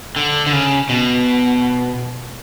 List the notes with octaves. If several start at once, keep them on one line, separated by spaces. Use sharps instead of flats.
D3
D3
C#3
B2